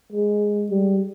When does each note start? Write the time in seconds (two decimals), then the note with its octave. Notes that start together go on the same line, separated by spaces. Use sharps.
0.12 G#3
0.70 G3